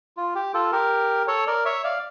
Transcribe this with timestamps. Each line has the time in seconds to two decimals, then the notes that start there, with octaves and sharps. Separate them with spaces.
0.17 F4
0.35 G4
0.54 F4 A4
0.72 G4 A#4
1.28 A4 C#5
1.47 A#4 D5
1.65 C#5 E5
1.84 D5 F5